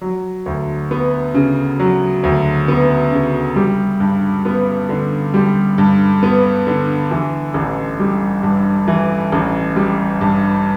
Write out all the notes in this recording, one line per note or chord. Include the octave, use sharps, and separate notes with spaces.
F#3
D2
B3
C#3
F#3
D2
B3
C#3
G3
G2
B3
D3
G3
G2
B3
D3
E3
A1
G3
G2
E3
A1
G3
G2